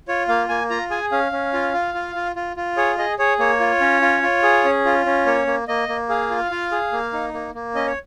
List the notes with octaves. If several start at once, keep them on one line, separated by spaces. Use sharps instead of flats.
F4 C#5
A#3 F5
A#3 G#5
F4 A#5
G#4 G#5
C#4 F5
C#4
F4
F4
F4
F4
F4
F4
G#4 C#5
G#4 D#5
G#4 C#5
A#3 C#5
F4
C#4
F4
F4
G#4
C#4
F4
C#4
A#3 C#5
A#3
A#3 D#5
A#3
G#4 F5
F4
F4
G#4
A#3
D#4
A#3
A#3
C#4 D#5
C#5